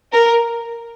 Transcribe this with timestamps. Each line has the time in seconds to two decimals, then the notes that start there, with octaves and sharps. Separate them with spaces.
0.13 A#4